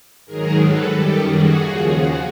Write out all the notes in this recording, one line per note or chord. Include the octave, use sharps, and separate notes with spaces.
G#2 D#3 F#3 G#4 A#4
A4 B4
F#2 D#3 G3 G4 A4
F#4 G#4
D#2 C#3 F3
F#4 G#4